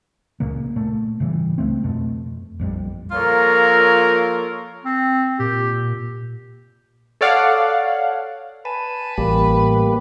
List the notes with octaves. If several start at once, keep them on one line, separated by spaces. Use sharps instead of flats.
C#2 A#2 C#3 A#3
A#2 A3
G#2 C#3 E3 G3
C#2 A2 A3 C4
F2 B2 A3
A#1 F2 D#3 G3
F3 A#3 F4 A4 A#4 C#5
C4
A#2 G4
A4 C#5 D5 F5 F#5
B4 G#5 A5
A1 G3 A#3 G4